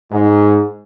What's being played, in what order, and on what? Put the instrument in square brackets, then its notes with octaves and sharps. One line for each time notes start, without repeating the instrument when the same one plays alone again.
[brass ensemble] G#2